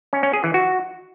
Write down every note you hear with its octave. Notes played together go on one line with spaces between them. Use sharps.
C#4
C#4
G#4
E3
F#4